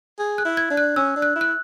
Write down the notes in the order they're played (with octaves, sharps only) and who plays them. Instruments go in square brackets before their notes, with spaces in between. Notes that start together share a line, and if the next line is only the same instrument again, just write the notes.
[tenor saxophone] G#4
[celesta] F#6
[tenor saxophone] E4
[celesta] G#6
[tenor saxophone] D4
[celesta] F#6
[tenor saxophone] C#4 [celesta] E6
[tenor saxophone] D4
[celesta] F#6
[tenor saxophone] E4
[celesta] F#6